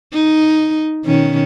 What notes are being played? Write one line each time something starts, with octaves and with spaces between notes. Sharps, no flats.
D#4
B2 D#3 C#4